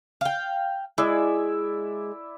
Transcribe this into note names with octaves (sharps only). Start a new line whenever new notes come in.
F5 G5
G#3 E4 D5 E5